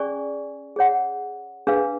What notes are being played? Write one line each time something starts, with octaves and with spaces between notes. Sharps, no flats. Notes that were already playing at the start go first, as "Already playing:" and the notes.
Already playing: C#4 G#4 D5 G#5 C#6
G#4 C#5 F#5
D4 G#4 B4 F5